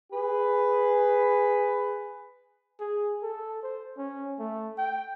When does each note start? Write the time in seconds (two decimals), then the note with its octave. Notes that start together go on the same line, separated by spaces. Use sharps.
0.12 G#4 B4
2.80 G#4
3.23 A4
3.63 C5
3.97 C#4
4.39 A3
4.78 G5